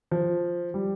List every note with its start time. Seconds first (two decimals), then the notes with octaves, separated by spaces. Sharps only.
0.12 F3
0.74 G3